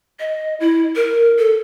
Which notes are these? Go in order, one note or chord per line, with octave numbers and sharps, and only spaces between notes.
D#5
E4
A#4
A4